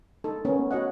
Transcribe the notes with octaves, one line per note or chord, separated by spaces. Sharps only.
D#4 A4
B3 C#4 A#4
A3
F#4 C#5 D#5 F#5